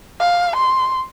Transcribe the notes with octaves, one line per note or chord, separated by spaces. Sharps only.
F5
C6